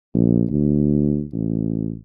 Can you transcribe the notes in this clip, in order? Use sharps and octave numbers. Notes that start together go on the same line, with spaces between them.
A#1
D2
A1